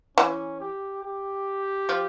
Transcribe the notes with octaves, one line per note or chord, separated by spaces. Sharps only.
E3 C#4
G4
G4
F3